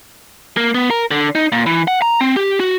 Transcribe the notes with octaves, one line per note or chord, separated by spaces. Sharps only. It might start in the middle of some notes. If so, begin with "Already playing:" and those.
A#3
B3
A#4
D3
D#4
A#2
E3
F#5
A#5
C4
G4
F#4